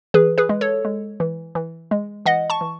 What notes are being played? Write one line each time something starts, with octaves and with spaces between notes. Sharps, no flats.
E3 G#4 B4
G#4 B4
G#3
A4 C#5
G#3
E3
E3
G#3
E3 D#5 F#5
A5 C#6
E3